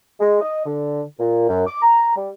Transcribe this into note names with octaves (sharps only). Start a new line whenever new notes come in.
G#3
D#5
D3
A#2
F#2
D6
A#5
G3